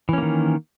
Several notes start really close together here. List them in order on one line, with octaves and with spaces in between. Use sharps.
E3 C#4 A#3 D#3